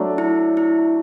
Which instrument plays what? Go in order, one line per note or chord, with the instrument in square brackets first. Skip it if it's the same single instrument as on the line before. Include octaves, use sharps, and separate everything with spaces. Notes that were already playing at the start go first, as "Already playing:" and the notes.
Already playing: [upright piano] F#3 A3 D4
[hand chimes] E4
E4